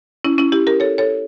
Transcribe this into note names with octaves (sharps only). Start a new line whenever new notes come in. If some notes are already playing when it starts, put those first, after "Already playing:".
C#4 E4
C#4 E4
E4 G4
G4 A#4
A4 C#5
A4 C#5